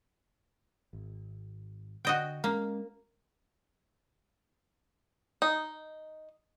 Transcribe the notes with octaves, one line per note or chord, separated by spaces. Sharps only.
G#1
D3 F#4 D#5 G5
G#3 A#3 C#4
D#4